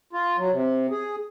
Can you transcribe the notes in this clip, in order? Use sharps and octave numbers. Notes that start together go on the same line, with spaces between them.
F4
F#3
C3
G#4